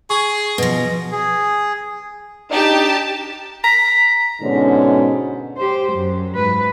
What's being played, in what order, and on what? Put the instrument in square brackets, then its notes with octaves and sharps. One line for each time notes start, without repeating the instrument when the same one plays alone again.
[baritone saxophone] G#4 [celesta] C#6
[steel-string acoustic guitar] B2 F3 [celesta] B4 A#6
[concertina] G#4
[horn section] D4 D#4 [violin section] G4 A5
[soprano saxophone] A#5 [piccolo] B6
[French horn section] G#2 B2 D3 C#4
[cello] G4 C5
F#2
G#2 B4